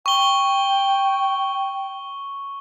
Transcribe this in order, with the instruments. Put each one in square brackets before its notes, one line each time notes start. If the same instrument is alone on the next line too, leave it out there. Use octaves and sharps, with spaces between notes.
[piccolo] G5 [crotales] C#6 G7